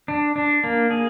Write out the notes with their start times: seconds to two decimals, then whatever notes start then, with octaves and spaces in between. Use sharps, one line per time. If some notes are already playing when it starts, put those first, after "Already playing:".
0.08 D4
0.36 D4
0.64 A#3
0.91 G#4